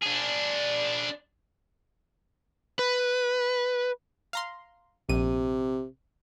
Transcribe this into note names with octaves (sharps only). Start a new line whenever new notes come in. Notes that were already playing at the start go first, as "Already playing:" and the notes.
D4 G#4
B4
F5 A#5 C6
A#1 C3 D#7